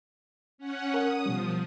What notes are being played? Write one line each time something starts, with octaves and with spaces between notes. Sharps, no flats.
C#4 F#5
A#4 F#5 D#6
B2 F3 G3